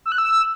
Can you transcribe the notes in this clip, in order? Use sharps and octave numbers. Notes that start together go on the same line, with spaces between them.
E6
F#6
E6